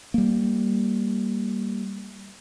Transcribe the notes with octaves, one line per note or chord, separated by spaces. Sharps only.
G3 A#3